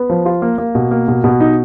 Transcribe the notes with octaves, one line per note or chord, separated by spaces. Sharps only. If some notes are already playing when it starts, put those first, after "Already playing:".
Already playing: B3
F3
F4
A#3
A#3
B2
A#3
B2
B2
D#4